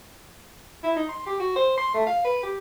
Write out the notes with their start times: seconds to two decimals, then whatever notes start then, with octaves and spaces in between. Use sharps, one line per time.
0.83 E4
0.96 D#4
1.09 C6
1.26 G4
1.40 F#4
1.56 C5
1.77 C6
1.94 A3
2.07 F5
2.24 B4
2.43 G4